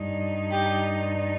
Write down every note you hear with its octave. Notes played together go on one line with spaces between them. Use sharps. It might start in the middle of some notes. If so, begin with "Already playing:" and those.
Already playing: G2 G3 D#4
G4